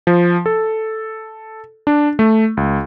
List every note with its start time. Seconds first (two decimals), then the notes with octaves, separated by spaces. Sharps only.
0.07 F3
0.46 A4
1.87 D4
2.19 A3
2.57 C#2